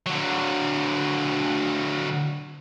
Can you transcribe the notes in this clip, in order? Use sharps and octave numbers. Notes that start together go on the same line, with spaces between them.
D3 F#3